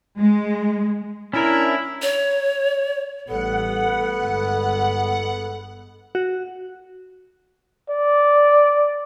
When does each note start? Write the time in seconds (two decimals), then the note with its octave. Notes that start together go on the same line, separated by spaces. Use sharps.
0.17 G#3
1.33 C#4 D4 E4 A#4
2.02 C#5
3.28 A1 A2 G3 B3 A4 F#5
4.18 G1 G#3
6.15 F#4
7.90 D5